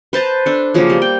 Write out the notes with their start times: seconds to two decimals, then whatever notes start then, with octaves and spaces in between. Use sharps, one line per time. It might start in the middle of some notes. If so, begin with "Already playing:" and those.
0.13 B4 C5 A5 A#5
0.46 D4 A4
0.74 C#3 F3 F#3 A#3
0.90 G3
1.02 G5